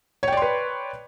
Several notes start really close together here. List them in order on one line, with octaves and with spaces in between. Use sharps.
C#5 G5 D5 C6 B4